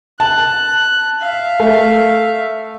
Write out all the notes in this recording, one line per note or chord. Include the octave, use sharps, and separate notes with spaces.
A5 F#6
E5 F5
A3